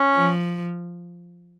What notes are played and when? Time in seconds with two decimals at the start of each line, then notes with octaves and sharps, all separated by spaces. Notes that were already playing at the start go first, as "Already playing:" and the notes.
Already playing: C#4
0.15 F3